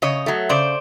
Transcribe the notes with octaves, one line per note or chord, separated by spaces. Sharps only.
C#3 C#5 D#5
F#3 A3
C#3 C5 D5